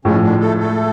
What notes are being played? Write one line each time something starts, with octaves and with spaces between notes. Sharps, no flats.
A2 C#3 F3 G#3 C#4
D3 D4
A3 A4
A3 A4